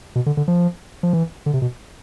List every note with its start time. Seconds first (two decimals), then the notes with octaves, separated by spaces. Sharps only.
0.15 B2
0.26 D3
0.37 D3
0.48 F3
1.03 F3
1.13 E3
1.46 D3
1.53 C3
1.62 B2